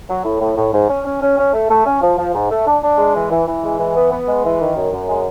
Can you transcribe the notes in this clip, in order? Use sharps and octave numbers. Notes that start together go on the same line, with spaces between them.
F#3
A2
A2
A2
G#2
C#4
C#4
C#4
C#4
A3
A3
C#4
F3
F3
G#2
A3
D4
D4
G#3
E3
E3
E3
G#3
E3
B3
B3
G#3
E3
D#3
F#2
F#2
G#3